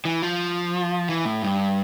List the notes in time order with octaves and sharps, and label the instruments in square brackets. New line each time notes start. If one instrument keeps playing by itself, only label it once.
[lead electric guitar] E3
F3
E3
A2
G2